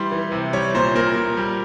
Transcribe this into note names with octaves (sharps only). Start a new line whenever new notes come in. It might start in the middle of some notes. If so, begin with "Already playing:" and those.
Already playing: E3 G3 C6
E3
C3
G3 C#5
A#2 C5
A#2 A#4
A#2
G3